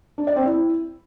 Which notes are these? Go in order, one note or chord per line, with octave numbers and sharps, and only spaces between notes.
D4
D5
C4
E4